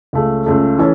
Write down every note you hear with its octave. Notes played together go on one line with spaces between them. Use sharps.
C#2 C#3 A3
C#2 C#3 A3
E3 C#4 A4